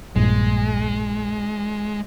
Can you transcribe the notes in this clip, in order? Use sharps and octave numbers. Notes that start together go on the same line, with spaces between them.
A#1 G2 A#2 G#3